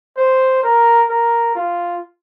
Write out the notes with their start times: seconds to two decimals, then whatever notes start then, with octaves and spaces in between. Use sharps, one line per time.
0.17 C5
0.63 A#4
1.09 A#4
1.55 F4